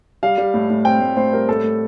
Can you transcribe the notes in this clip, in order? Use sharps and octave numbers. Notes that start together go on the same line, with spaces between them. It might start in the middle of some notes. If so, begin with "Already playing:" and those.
G3 F5
G3
A2
A2
C4 G5
A2 C5
A2 C5
G3 A#4
A2 A4
A3